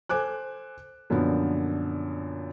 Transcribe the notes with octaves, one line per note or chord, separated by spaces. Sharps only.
A4 C5 G#5 D6 F#6
F#2 A#2 D3 F3 B3